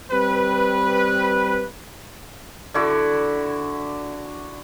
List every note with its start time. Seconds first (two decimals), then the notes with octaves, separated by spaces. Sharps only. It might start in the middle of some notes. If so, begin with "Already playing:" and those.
0.11 G3 C4 B4
2.74 D3 E4 F#4 D5